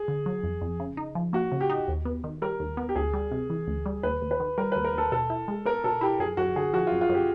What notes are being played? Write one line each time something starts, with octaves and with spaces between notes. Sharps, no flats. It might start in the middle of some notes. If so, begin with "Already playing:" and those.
Already playing: G#4
D3
F#3
F2
F2
C#3
D#4
F3
A#3 F#4
C#3
G4
D#4
D#2
B3
D#3
G3 A#4
D#2
B3
G4
D2 G#4
G3
C3
E3
D2
G3
D#2 B4
D#2
B4
D#3
G3 A#4
B4
D#2
A#4
D#2 A4
B2 A4
E4
G#3
B3 A#4
B2 A4
E4 G4
F#2 G#4
F#2 F#4
D3 G#4
F3 F#4
F4
F#2
F4
F#2 G4